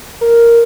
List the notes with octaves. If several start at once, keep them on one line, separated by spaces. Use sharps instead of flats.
A#4